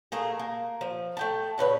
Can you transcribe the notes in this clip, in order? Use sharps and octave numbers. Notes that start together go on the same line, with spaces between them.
A3 A#3 G#4
A#3
F3
A3 G5 A5
A#2 C#3 B4 C#5